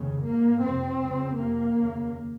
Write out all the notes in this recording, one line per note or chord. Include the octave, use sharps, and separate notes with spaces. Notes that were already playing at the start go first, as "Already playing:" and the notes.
Already playing: F1 D#2 C#3
G#1 G#2 A#3
F1 F2 C3 C4
C#2 C#3
F1 F2 C3 A#3
F1 D#2 C#3